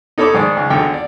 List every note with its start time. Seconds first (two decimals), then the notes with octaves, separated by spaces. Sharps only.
0.18 D#4 A4 C#5 B5 D6
0.34 G#2 D#3 D5 D#6
0.57 C#2
0.70 G#1 D3 G5
0.94 D5